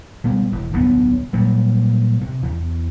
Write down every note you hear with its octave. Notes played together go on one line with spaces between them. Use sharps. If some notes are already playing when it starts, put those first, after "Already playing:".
B2 G3 G#3
E1
D1 B1 B3
A#2 F#3 G3
C3
E2